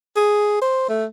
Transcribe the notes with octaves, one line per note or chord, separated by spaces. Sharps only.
G#4
C5
A3